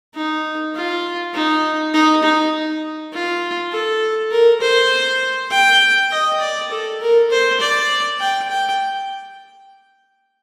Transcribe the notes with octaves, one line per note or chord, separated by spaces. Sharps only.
D#4
F4
D#4
D#4
D#4
F4
A4
A#4
C5
G5
D#5
D5
A4
A#4
C5
D5
G5
G5